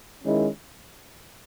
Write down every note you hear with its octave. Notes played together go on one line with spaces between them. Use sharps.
D#3 G#3 C#4 E4